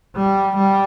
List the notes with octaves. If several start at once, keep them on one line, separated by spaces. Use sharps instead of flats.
G3
G3